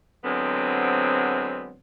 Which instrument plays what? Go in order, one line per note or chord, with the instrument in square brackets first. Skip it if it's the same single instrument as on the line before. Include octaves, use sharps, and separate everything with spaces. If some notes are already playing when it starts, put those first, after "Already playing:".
[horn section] D3 F#3 G#3 B3 C4